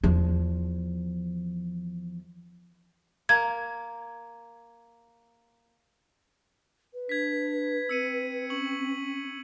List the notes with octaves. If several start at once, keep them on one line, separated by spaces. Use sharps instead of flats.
E2 F3
A#3 G#6
B4
D4 G#6 B6
C4 E6 C#7 D#7
C#4 C#6 F#7